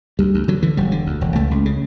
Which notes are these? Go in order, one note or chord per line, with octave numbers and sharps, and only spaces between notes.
D2 G3
D2
D3 F#3
D3 E3
E1 G3
D3
D2
E1
C#2 A3
C#2
C#3